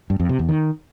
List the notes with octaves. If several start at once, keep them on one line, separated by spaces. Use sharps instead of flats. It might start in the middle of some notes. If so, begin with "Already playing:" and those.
G2
F2
C3
E2
D#3